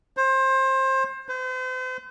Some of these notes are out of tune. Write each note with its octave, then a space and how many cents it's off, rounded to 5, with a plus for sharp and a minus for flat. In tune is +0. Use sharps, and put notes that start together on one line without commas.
C5 +25
C5 -40